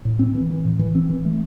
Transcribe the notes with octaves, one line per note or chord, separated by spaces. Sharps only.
A2
C4
E3
E3
A2
E3
C4
E3
A3